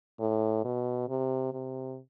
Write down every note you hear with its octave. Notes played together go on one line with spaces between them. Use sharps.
A2
B2
C3
C3